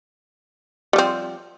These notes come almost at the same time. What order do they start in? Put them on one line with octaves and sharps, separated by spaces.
G3 F3 C4